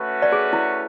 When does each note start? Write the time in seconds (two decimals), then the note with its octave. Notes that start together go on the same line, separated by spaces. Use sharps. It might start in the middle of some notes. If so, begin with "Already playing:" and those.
Already playing: A3 C#4 F#4 B4
0.22 D5
0.32 G#4
0.53 E4